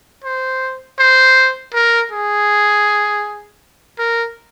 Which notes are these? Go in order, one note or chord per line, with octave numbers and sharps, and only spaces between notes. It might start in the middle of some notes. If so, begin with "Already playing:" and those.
C5
C5
A#4
G#4
A#4